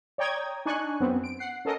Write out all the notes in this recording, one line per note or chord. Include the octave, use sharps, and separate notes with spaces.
C#5 D5 G5 A#5 D#6 G#6
D4 D#4 G#5 C#6 F#6
F#2 B3 C4
D7
F#5 C7
C#4 A4 A#4 D#5